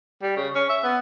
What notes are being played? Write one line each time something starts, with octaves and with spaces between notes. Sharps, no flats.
G3
C#3
C#4
E5
B3